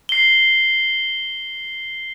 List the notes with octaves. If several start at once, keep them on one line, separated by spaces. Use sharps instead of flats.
C7 G7